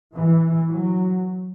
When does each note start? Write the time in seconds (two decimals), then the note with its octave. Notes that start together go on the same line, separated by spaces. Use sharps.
0.16 E3
0.70 F#3